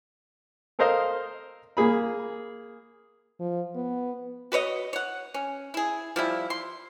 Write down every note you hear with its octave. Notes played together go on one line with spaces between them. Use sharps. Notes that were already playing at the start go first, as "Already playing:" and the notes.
A4 A#4 C5 D#5 F5
A#3 G#4 B5
F3
B3
F#4 B4 C#5 D#5
C#5 F#5
C#4
E4 G#4
F3 G3 E4
C6